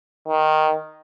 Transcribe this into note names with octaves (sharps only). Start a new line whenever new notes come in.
D#3